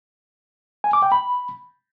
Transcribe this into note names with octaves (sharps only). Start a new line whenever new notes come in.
G#5
D6
G5
B5